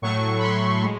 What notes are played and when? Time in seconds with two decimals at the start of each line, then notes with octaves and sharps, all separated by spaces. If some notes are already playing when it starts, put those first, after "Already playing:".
0.02 A2 F#3 A3 C#6
0.38 B5
0.43 C6
0.84 G#3